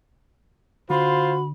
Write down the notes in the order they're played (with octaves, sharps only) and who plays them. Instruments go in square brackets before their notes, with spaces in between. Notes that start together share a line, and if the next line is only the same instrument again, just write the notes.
[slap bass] D3 [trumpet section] F4 C5 [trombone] F#4 [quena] B5